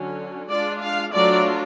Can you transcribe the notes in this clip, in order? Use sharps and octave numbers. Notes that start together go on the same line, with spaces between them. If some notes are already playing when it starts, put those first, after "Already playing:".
Already playing: D3 F#3 C#4
G#3 D4 F4 D5
F5
F#3 A3 D4 F4 D5